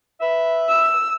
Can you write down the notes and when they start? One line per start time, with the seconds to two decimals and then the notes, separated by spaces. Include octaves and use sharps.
0.21 B4 E5
0.69 E6